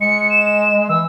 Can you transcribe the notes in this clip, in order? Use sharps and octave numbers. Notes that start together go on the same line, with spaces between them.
G#3 C#7
E7
E3 E6